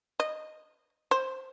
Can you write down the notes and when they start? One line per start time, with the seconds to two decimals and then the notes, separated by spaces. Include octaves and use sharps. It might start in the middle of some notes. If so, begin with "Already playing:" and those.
0.20 D#5
1.11 C5